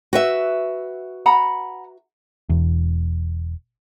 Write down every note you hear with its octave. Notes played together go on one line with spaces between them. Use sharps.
F#4 B4 E5
F#5 A#5 B5
E1 E2